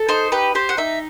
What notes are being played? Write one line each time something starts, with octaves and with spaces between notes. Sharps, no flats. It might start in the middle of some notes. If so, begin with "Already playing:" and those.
Already playing: A4
D#4 C5
G4 B4
G4 C5
F#5
D#4 E5